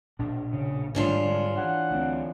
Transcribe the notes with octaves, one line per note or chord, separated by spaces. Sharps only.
A#1 B2 D4
C#3
A1 G#2 D3 D#3 G3 C#4 D4 F4
D3 G#3
E3 F#5
D2 C4